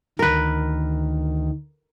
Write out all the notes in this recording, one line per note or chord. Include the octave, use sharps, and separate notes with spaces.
D2 D#3 A#4 B4